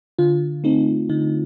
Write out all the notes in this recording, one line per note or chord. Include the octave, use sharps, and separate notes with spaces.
D3 F4
A3 C4 D#4
D3 D#4